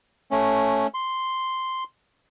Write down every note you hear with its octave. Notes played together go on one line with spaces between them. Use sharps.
A3 C#4
C6